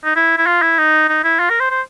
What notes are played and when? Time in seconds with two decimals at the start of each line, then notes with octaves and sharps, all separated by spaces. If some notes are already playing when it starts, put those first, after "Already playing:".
0.04 D#4
0.16 E4
0.38 E4
0.46 F4
0.62 E4
0.78 D#4
1.09 D#4
1.24 E4
1.40 F4
1.50 A#4
1.60 C5
1.70 C5